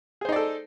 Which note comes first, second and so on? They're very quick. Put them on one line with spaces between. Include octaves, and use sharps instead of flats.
G#4 C5 D#4 D5 A4